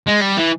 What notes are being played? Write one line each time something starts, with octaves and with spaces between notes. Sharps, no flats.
G#3
G3
E3